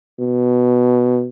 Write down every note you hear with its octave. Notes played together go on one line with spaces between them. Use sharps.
B2